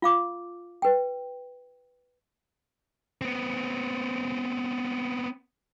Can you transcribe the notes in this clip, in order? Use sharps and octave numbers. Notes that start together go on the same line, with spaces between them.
F4 F5 D6
B4 G5
B3 C4